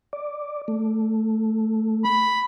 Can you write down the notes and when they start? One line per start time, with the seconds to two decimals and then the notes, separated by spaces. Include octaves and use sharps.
0.13 D5
0.68 A3
2.04 B5